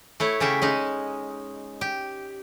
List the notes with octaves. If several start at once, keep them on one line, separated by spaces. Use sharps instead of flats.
A3 E4 C#5
C#3 C#4 G4 E5
G#3 C#4 D#4
G4